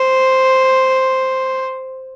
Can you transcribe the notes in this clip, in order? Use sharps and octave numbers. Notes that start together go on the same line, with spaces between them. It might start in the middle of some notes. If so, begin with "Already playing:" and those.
Already playing: C5